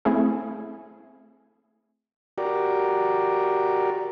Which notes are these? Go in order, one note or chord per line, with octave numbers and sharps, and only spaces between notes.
A3 C4 E4 G#4
F#4 G4 A#4 D5